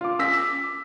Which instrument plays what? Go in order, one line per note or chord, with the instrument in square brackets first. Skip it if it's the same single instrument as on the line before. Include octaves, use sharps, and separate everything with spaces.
[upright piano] F4 D6
[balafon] C#4 [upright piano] E6 A#6 B6
[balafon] D6